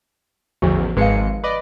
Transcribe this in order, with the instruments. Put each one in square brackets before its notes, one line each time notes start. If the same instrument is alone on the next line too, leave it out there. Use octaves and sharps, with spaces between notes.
[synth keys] A1 E2 [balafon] D3 F3 F#4
[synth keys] G#1 G#3 C#7 [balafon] B4 F5
[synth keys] B4 D5 D#5